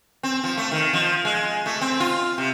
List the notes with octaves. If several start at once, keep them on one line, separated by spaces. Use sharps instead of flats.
C4
F3
A3
D#3
F3
G#3
A3
C4
F4
C3